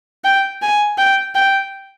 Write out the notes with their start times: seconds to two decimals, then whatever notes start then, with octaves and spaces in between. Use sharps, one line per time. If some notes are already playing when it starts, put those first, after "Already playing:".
0.24 G5
0.62 G#5
0.98 G5
1.35 G5